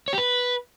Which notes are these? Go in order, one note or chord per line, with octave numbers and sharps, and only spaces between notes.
C#5
G4
B4